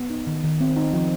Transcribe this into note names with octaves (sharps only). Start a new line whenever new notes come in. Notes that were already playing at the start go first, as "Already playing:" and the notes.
Already playing: B3
D#4
D#3
D#3
C4
D#4
F3